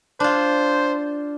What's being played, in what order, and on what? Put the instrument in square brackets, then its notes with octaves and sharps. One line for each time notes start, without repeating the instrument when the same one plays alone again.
[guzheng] D4 F4 [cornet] C5